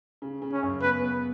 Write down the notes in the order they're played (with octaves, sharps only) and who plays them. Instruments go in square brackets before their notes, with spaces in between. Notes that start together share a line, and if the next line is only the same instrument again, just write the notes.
[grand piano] C#3
C#3
[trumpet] C#4
[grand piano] F#2
[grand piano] B3 [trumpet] B4
[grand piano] B3